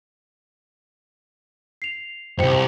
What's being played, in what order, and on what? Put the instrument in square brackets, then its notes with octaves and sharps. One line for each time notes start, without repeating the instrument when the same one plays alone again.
[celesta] C7 F7
[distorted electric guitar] C2 F#2 [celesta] C5 G5 C#7